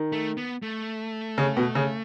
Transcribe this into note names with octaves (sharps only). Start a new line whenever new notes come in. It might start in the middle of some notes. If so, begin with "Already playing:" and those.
Already playing: D#3
A3
B3
A3
C#3
B2
C#3